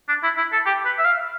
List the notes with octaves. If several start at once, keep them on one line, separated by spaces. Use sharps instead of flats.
D4
E4
E4
A4
G4
B4
E5
F5